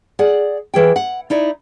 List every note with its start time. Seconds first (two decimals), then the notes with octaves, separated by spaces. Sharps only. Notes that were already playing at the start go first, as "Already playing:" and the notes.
0.19 G#4 D5 F#5
0.74 E3 G#4 G5
0.96 F#5
1.30 D#4 E4 D5